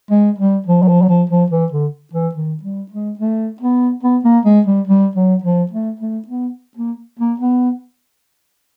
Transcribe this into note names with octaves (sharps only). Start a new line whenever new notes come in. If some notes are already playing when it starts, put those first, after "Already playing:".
G#3
G3
F3
F#3
F3
F#3
F3
F3
E3
D3
E3
D#3
G3
G#3
A3
B3
B3
A#3
G#3
G3
G3
F#3
F3
A3
A3
B3
A#3
A#3
B3